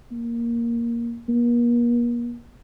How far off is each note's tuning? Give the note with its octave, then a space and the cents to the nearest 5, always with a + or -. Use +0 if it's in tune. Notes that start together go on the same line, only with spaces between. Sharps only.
A#3 +5
A#3 +40